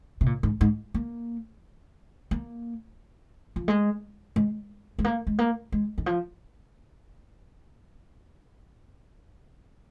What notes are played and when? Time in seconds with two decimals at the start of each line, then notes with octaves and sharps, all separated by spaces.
0.21 C3
0.26 A#2
0.43 G#2
0.61 G#2
0.94 A#3
2.31 A#3
3.56 F3
3.68 G#3
4.36 G#3
4.99 G#3
5.04 A#3
5.27 G#3
5.38 A#3
5.72 G#3
5.98 D#3
6.06 F3